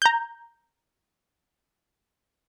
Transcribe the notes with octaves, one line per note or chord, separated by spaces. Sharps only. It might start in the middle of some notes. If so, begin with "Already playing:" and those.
A#5 G6